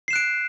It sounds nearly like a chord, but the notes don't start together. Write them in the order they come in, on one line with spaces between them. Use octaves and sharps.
C7 E7 F#6 D7